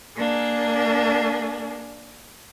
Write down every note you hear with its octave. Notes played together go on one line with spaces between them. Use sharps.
A#3 D4 G#4